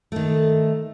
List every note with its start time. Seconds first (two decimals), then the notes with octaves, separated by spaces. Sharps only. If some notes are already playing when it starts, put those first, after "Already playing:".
0.12 D#3 A3